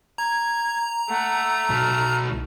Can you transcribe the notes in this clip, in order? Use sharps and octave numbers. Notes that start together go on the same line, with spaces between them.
A#5 G#6
A3 F#5
B1 F6